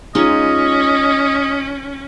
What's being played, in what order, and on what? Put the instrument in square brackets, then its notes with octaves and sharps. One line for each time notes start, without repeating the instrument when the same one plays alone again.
[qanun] G#3 D#4 F4 [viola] C#4 [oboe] D#5